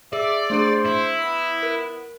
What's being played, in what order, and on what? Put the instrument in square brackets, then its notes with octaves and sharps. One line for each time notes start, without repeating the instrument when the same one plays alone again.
[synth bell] G#4 [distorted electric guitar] D5 [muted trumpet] E5
[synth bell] A3 D4 G#4 [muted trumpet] C5
[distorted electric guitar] E4
[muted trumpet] B3 [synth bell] B6
[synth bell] A#4